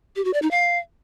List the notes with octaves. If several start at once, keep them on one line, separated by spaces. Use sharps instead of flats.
G4
F#4
D5
D#4
F5